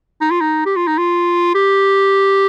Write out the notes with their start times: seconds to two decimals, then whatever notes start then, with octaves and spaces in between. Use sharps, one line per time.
0.21 D#4
0.31 F4
0.41 D#4
0.66 G4
0.76 F4
0.87 D#4
0.98 F4
1.55 G4